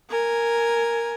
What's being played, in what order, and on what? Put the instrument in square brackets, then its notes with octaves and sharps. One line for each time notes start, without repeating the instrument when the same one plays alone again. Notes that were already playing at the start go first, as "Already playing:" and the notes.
[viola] A#4 G#5